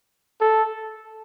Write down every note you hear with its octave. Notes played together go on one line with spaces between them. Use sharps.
A4